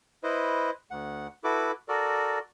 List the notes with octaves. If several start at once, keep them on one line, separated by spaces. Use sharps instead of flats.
E4 B4 C5 D#5
D2 F#5
E4 F#4 A4 B4 D6
F#4 A4 A#4 D5